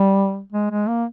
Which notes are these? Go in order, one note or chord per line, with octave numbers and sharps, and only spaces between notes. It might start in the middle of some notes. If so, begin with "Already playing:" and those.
Already playing: G3
G#3
G#3
A#3